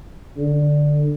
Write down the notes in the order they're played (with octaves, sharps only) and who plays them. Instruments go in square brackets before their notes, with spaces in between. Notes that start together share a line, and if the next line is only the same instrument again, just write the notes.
[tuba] D3